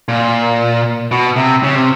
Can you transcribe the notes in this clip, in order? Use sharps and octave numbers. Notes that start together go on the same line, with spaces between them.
A#2
B2
C3
C#3
C3